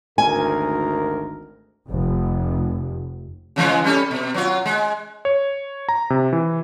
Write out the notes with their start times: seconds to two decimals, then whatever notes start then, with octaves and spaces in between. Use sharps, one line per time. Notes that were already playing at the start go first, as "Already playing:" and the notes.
0.18 G#1 D2 A#4 G#5
1.87 F1
3.56 C#3 E3 G#3
3.84 G3 C#4 A4
4.11 B2
4.34 F#3 F4
4.66 G#3
5.25 C#5
5.89 A#5
6.10 C3
6.33 E3